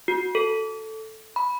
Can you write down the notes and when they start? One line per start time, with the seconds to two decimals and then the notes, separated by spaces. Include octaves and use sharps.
0.08 F#4
0.35 A4
1.36 B5